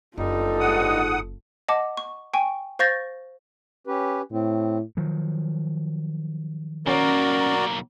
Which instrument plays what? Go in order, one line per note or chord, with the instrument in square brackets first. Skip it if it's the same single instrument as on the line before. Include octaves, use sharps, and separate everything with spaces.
[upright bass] F#1 [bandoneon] G2 G3 D#4 [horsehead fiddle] F4 A4
[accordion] G#2 F#5 D#6
[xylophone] D#5 F#5 A5 D6
C#6
G5 G#5 C#6
C5 F5 C#6 G6 A6 A#6
[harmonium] C#4 G4 B4
[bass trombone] A2 [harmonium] C4
[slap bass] D#3 F3 F#3
[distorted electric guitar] B1 A#3 [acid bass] C#4 [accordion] F#4 A#4 D5